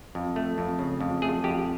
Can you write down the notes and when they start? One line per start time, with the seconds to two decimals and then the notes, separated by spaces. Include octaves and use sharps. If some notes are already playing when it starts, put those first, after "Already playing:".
0.15 F2
0.36 A3
0.58 F2
0.79 C#3
1.01 F2
1.22 A3 G#4
1.44 F2 G4